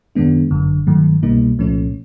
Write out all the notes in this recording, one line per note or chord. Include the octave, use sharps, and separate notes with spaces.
F#2 D#3 G#3 B3 D4
G1 F#2 D3
G2 D#3 F#3 A3
C2 B2 G3 A#3 D#4
C2 A#2 F3 A3 C#4